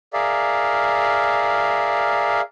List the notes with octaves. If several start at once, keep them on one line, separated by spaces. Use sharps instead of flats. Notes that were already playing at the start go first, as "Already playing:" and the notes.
G#4 A#4 D5 E5 F5